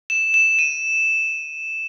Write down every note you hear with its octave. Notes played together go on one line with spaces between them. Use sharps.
E7
E7
D#7